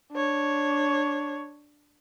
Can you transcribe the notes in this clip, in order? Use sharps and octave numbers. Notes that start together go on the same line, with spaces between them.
D4 C#5